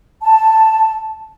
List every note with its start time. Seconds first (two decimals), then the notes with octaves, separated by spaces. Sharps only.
0.22 A5